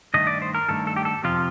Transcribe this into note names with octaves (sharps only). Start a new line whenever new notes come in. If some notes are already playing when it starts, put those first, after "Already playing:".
G2 D#3 A3 D#5
D5
C5
A#4
G2 D#3 A3 A4
A4
G4
A4
F2 C3 F3 F4